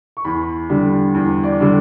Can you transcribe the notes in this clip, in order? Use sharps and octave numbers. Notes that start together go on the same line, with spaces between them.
C#6
E2 B5
D3 G3 D4
E2
D5
D3 G3 D4